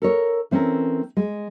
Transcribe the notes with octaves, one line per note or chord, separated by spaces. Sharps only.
A4 A#4 C#5
E3 C4 C#4 A4 A#4
G#3